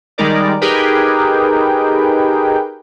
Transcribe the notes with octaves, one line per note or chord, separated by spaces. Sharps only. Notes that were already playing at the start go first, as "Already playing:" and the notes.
D#3 G3 G#3 D#4 A#4 D5
D#4 G4 G#4 A#4 B4 G5